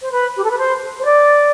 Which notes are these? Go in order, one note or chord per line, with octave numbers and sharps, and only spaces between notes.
C5
B4
G4
A4
B4
C5
C5
D5